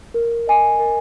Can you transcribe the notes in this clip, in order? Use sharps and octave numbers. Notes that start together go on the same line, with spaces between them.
A#4
D#5 G#5
A#4